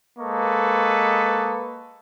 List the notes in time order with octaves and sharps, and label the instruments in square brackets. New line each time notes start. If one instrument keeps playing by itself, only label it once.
[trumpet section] G#3 A#3 A4 B4 D#5 C#6